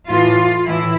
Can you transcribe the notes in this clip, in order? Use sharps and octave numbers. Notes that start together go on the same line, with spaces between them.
A2 E3 F4
A2 E3 E4